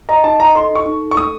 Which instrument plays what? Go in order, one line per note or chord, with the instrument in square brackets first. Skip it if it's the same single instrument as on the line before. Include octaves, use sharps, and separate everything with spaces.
[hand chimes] D#5 [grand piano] A#5
[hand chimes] D#4 [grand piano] A5
[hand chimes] D#5 [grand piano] A#5
[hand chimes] A4 [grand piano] C6
[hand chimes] D#4 [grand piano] C#6
[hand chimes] D#4
A4
[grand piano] C#6
[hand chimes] A3 [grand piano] D#6